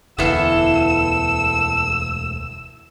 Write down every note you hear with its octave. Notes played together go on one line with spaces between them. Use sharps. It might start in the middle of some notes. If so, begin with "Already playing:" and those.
E1 D2 E3 B3 E4 A4 F5 E6